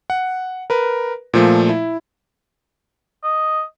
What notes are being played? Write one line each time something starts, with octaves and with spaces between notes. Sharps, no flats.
F#5
A#4 B4
A#2 F3 A3
E4
D#5